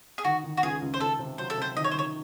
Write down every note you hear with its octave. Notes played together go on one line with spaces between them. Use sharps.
G#4
D#3 F#4
D#3
F#4
C#2 G#4
C#2
C5
C#2 A4
C3
F#3 C5
A4
C3 C5
D#3 D#5
C#5
C5
D#3 C#5